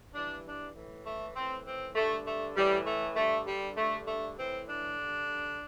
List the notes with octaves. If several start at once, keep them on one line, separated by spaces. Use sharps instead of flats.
G2 E3 D4
D4
A2 E3
A3
A2 E3 C4
C4
G2 D3 A3
A3
A2 E3 G3
A3
G2 D3 A3
G3
G2 D3 A3
A3
A2 E3 C4
D4
G2 D3